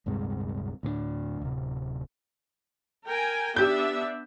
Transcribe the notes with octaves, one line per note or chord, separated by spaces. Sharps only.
D1 G2 C3 G#3
D2 A2 A#3 D4
D1 C3
A#4 G5 G#5
B3 D4 G4 E5 G6